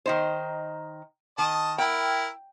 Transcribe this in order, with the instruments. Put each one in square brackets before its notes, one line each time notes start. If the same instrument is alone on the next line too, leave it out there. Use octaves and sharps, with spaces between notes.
[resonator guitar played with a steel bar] D#3 D#4 C5
[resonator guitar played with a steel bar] D#3 [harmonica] D#5 A5
[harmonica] E4 A#4 [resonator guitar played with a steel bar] G5